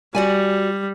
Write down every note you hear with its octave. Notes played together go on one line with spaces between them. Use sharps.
G3 F#4 D5 G#5